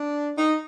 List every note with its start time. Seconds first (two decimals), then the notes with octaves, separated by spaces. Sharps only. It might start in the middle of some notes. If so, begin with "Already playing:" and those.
Already playing: D4
0.38 D#4